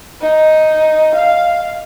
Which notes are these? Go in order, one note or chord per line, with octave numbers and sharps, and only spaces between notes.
D#4
F5